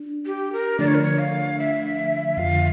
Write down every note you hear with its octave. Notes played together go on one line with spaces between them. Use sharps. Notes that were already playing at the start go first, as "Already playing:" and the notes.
Already playing: D4
G4
A#4
D3 F3 A3 D4 D5
C#5
A#4
C#5
F5
E5
F2 D3 F3 F5